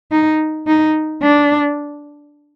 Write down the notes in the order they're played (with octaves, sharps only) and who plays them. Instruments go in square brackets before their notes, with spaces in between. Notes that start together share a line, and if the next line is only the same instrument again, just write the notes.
[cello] D#4
D#4
D4